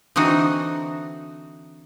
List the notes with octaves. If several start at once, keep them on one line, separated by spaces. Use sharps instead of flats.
D3 E3 C4 D#4 F#4